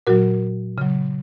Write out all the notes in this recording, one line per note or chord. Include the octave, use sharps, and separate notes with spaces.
A#2 F#3 F#4 A#4
C#3 F#3